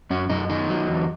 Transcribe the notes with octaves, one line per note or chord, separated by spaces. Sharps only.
F#2 C#4
F#2 D#4
D#3 D#4
F#3
E2